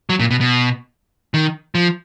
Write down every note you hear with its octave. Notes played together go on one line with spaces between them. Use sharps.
F#3
A#2
B2
B2
D#3
F3